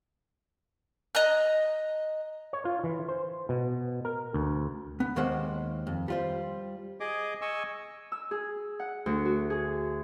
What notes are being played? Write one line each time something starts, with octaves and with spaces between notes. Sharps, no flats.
D#5 A#5 F#6
C#5
F4
E3
C5
B2
A#4
D2
B3
D#2 D#3 G#3 A#3 C5 F#5
F2
G3 F4 C5
G#4 D#5 D6
D#5 G#5 C#6 E6
E6
G#4
F#5
D2
F#4
G#4